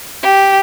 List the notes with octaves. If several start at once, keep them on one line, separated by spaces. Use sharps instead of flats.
G4